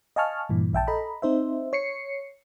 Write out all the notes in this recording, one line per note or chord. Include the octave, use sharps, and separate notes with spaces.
D#5 F5 G#5 A5 C#6 F6
G2 A#2 E3
A#1 E5 G5 A5
A4 D#5 A#5 B5
C4 D#4 C5 E5
C#5 C7 C#7